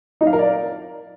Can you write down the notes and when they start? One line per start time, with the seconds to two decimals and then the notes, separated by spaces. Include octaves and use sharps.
0.21 D#4
0.27 F5
0.33 A#4
0.39 D5